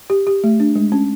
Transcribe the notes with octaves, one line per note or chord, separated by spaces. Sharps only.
G4
G4
A3
D4
G#3
C#4